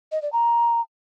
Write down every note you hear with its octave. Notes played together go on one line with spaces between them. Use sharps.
D#5
D5
A#5